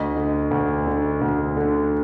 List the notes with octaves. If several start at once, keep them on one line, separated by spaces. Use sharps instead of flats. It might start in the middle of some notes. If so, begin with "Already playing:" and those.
Already playing: D2 D#5
D3
D2
D3
D2
D3